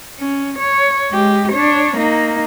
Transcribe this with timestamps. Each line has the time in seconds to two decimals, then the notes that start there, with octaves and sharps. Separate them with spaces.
0.19 C#4
0.59 C#5
1.10 G#3 G4
1.52 D4 C#5
1.97 A#3 D#4